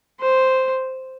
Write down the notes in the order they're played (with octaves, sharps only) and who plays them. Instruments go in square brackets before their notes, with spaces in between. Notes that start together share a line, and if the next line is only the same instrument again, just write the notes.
[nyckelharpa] C5